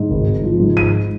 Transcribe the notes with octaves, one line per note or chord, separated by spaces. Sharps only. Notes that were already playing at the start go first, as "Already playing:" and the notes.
Already playing: G#2
G#1
G#1
F3
G#2
G#1 D#7